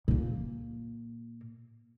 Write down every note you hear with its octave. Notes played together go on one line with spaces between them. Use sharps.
A#2 A#3